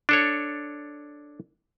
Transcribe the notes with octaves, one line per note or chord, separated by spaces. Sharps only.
D4 A4 C#5